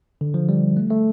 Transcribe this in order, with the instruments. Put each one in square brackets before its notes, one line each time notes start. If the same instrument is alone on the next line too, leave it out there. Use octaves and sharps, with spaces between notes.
[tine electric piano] D3
F3
G3
A3
A3